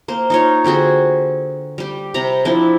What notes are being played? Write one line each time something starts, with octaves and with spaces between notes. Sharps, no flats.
A#3 C5
D#4 F4 C#5
D3 C4 F#4 G#4
G3 G4
C3 A#5 B5
F3 C4 D4 E4